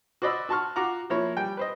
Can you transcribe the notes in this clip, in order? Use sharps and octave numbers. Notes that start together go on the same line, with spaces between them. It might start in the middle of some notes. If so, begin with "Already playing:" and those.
F#4 C5 D5 D#5 B5 E6
F#4 A5 C6 C#6 F6
F4 F#4 F#5 A#5 D6
F3 A#3 E4 C#5
G3 G5
B4 C5 D#5